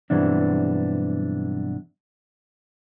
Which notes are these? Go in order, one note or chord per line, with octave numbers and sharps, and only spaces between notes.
B1 G2 E3 B3 C4 D4